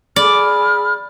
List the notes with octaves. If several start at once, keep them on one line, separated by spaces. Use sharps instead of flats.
G#4 D5 B5 F6